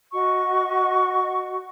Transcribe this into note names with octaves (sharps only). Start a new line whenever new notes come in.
F#4 D#5 C#6